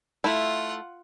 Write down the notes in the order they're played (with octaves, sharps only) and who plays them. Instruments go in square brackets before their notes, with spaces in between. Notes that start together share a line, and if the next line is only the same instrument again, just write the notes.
[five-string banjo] A3 E4 [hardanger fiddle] F4 F#5